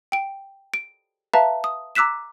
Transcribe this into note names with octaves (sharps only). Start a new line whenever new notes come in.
G5 D7
D7
B4 E5 F5 A5 A#5
D#6
A#5 D6 E6 F#6 B6 E7